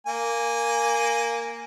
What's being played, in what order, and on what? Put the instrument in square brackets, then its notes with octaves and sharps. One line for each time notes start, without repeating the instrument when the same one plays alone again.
[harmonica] A#3 G#5